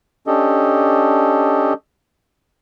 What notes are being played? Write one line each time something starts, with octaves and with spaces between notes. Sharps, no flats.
C#4 D4 G4 A4 D#5